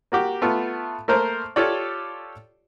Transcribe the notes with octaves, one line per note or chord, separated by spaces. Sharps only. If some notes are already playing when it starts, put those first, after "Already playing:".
A#3 F#4 G4
A3 B3 F4
A3 A#3 A#4 C5
F4 G4 A4 C#5 D5